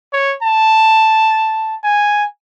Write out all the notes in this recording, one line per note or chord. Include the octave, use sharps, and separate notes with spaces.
C#5
A5
G#5